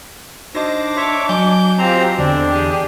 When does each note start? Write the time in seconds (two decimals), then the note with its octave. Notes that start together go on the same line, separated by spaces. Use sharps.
0.55 D4 D#4 F#4 C5 D#5 D6 A#6
0.97 C#5 E5 C6
1.29 F#3 D#5 G#5 A5 G6
1.78 C4 F4 G4 C5 A#5
2.18 E2 D3 C4 D4
2.50 G4 G#4